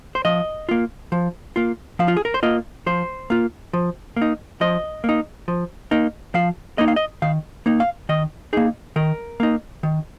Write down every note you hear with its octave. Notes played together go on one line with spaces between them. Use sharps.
C5
F3 D#5
A#3 F4
F3
A#3 F4
F3 F5
F4
G#4
A#4
C5
A#3 F4 D#5
F3 C5
A#3 F4
F3
A#3
D#4
F3 D#5
A#3 D#4
F3
A#3 D#4
F3 F5
A#3 D#4 D#5
F5
D#5
D#3 F5
A#3 D#4
F5
D#3 D#5
A#3 D#4 G#4
D#3 A#4
A#3 D#4
D#3